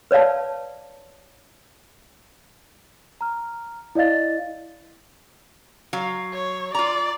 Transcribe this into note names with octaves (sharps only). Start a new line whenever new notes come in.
B4 C#5 D5 F5 A5
A#5 F6
E4 D5 D#5 F5 A6
F#3 F5
C#5
F4 D5 A#5